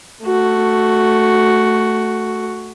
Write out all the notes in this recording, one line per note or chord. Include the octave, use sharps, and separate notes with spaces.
A3 F#4